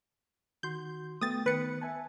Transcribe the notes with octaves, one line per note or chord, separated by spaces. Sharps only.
D#3 F#4 C6 G6
A3 B3 G5 D#6 A6
D#3 B3 B4 C#7
E5 G#5 A5